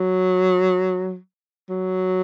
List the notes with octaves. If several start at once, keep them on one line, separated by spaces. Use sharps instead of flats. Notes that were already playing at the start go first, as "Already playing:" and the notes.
Already playing: F#3
F#3